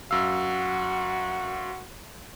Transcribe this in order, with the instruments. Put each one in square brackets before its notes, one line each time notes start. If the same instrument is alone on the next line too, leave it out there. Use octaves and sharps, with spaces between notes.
[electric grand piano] F#2 F5 [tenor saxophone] F#4 [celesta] E6